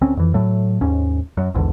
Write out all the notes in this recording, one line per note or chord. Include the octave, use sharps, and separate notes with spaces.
D2 C4 C#4
F2 E3
A2 F#3 A3
D#2 G#2 C#4
F#2
A#1 E2 G#2 D3